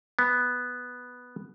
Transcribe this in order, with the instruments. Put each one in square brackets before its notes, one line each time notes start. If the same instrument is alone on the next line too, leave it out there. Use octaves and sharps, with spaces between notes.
[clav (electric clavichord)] B3